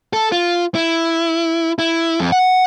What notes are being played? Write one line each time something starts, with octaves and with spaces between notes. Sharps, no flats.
A4
F4
E4
E4
F2
F#5